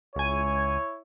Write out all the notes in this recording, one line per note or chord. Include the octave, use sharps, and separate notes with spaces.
C#2 E4 C#5 G#5